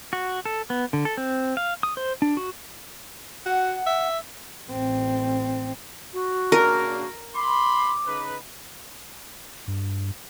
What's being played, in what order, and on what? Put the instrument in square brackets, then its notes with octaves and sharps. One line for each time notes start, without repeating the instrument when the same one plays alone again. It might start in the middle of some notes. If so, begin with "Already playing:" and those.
[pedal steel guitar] F#4
A4
B3
D3
A4
C4
F5
D#6
C5
D4
F#4
[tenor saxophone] F#4 [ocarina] F#5
[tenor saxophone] E5
[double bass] A1 C4
[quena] F#4
[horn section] C#3 A#3 D4 [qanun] A#4
[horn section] B5 C6 [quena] D6
[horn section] C#3 D#4 B4
[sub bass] G2